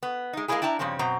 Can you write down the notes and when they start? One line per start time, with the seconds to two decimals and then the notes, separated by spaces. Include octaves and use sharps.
0.03 B3
0.33 G#3 D#4
0.48 G#3 A#3 C4 D#4 E4 G#4
0.62 D4 E4 G5 A5 A#5
0.79 G2 C#3 F3 C4 C#4
0.99 F#2 B2 C4 A#5